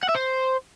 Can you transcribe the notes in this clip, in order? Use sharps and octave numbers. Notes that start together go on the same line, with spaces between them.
F#5
E5
C5